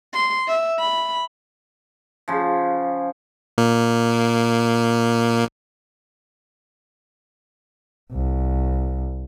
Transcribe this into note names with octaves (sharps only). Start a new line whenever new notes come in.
C6
E5
B5
C#3 F3
A#2 A#3
C2